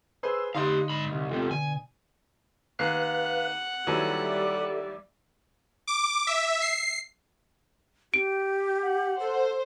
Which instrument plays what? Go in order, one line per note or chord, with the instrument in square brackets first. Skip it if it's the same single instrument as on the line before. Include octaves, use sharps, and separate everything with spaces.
[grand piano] G#4 B4 C5 [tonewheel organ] E6
[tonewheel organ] D3 [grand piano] D#4 D#5 C6 [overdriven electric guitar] G4 F5
[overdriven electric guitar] G#2 B5
C2
[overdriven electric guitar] E2 C3 [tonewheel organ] F4 A4 G5
[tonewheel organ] B2 D3 [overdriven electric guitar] G#5
[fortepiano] D#2 [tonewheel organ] B4 F5 F#6 [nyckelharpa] F#5
[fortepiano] D#2 E3 F#3 [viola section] G3 D5 E5 [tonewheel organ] A4
[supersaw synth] D6
E5
C7
[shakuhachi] G4 [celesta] D7
[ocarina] F#5
[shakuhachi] A4 [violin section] C5